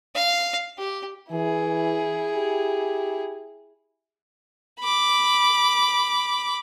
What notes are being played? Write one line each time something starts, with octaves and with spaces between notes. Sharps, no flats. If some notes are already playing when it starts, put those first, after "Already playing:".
F5
G4
E3 E4 G#4
G4
B5 D6